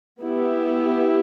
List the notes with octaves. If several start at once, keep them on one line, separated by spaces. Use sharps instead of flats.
B3 E4 G4